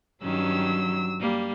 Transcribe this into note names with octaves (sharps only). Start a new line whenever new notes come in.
G2 D#3 F#3 C#4 E6
G3 A#3